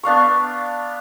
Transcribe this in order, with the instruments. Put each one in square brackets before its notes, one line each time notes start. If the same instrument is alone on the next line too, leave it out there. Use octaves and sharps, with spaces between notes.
[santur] B3 D4 F5 C#6